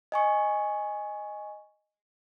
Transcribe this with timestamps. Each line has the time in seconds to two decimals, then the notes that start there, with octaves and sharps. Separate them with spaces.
0.12 D#5 G#5 C#6